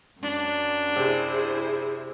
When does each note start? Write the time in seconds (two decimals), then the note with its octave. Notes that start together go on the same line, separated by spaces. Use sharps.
0.20 F#2 D4
0.96 C3 E4 G#4 C5